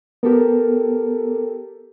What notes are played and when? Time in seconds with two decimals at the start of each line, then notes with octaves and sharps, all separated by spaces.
0.23 B3 G4 A4 A#4